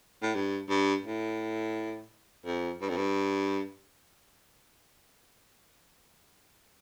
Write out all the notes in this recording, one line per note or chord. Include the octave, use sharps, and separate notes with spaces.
A2
G2
G2
A2
F2
G2
F2
G2